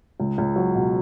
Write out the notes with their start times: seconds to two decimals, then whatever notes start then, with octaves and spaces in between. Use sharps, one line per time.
0.20 C#2
0.38 C#2
0.56 F#3
0.75 B2